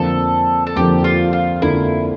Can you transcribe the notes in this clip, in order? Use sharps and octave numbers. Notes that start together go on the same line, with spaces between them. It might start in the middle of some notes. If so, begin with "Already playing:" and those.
Already playing: F2 D3 F3 A#3 A4
A4
F2 D3 F3 A#3 G4
F4
F4
F2 D3 F3 A#3 E4